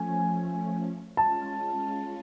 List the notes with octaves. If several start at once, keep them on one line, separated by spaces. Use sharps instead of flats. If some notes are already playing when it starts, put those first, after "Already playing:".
Already playing: F3 A3 C#4 G#5
G#3 C#4 F4 A5